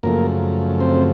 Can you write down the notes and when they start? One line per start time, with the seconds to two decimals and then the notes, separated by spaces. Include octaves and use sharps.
0.03 F#2 C#3 F3 A3 A#3 A#4
0.80 C4 C5